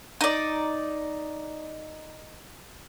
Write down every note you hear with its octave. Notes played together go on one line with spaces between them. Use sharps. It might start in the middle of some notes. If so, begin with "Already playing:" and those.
D#4 D5